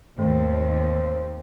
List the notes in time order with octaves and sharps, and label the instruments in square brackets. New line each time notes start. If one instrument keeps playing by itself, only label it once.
[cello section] D#2 [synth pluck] G#2 D#3 A3 [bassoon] C4